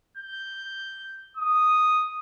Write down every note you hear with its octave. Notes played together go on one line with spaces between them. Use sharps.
G6
D#6